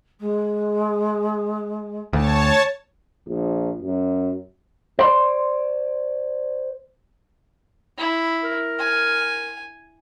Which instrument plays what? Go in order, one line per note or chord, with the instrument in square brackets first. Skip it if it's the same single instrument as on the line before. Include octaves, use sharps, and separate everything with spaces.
[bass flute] G#3
[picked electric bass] D2 [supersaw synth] C#5 A5
[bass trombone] A#1
F#2
[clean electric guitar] C5 D5 B5 C6
[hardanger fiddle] E4
[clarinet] A#4
[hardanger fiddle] G#5